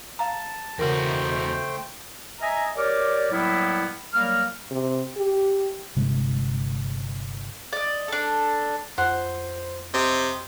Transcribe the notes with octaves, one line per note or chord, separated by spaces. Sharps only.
F5 A5 A#5
E2 C#3 A3 F#4 A#4 C5 G5
D#5 E5 G#5 A#5
G4 A#4 C#5 D5
A2 F#3 G3 A#3 B3 E4
F#3 G3 A#3 A#4 F6
C3
G4
G1 C3 G#3
D5 D#5
D4 A4
F2 C5 F#5 F#6
C3 D#5